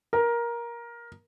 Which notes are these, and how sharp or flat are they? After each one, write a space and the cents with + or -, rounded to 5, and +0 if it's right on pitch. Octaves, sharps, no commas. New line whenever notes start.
A#4 +15